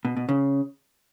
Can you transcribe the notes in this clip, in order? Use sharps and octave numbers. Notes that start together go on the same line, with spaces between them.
B2
B2
C#3